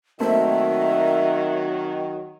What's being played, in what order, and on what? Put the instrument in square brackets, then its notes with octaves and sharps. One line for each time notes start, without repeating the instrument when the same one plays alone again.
[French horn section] D#3 F#3 [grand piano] A3 A#3 C4 [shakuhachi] E5